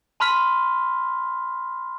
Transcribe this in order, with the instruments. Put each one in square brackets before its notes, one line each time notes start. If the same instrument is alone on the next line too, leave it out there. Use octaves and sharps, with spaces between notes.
[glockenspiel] A5 B5 C6 F6 B6